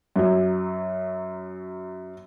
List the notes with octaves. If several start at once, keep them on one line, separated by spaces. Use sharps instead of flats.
F#2 F#3